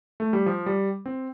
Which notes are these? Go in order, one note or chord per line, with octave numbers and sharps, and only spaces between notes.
A3
G3
F3
G3
C4